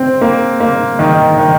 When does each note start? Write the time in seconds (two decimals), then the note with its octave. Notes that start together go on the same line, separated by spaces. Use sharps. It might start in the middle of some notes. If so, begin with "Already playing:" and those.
Already playing: C4
0.21 A#3
0.60 A#3
0.99 D#3
1.38 D#3